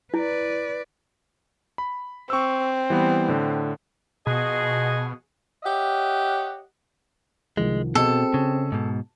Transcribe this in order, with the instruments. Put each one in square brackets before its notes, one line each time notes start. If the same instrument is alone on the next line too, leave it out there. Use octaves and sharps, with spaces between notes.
[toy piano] E4 [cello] B4 D5
[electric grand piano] B5
[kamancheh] C4 [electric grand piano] C#6 E6
[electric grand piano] E3 G3 B3
A2 D3
[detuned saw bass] B2 [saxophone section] F3 F#4 G#4 [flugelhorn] D#5
[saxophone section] G4 C#5 D#5 E5 F#5
[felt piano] C2 D#3 F3 [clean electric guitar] G#3
[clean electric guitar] B2 [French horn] C4 [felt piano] F#4 G#4 D#5 [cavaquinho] A4
[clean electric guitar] C#3
G#2 B2